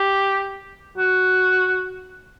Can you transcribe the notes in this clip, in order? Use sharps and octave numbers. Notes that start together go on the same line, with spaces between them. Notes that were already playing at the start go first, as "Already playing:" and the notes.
Already playing: G4
F#4